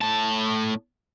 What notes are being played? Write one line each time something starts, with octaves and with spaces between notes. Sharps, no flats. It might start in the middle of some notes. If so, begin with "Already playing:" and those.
A2 A5